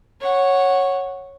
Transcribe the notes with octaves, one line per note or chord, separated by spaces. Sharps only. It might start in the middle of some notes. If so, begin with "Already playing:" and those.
C#5 F#5